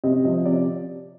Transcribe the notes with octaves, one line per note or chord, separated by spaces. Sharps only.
C3 D#5
F3 D#5
C3 D5